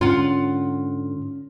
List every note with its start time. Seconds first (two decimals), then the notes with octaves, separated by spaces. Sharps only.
0.01 G#2 D3 C#4 F4 F#5